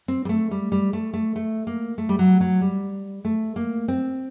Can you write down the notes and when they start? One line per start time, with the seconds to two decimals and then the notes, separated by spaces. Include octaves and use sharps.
0.08 C4
0.25 G3
0.29 A3
0.51 G3
0.72 G3
0.93 A3
1.13 A3
1.36 A3
1.67 A#3
1.98 A3
2.09 G3
2.19 F#3
2.41 F#3
2.61 G3
3.25 A3
3.56 A#3
3.88 C4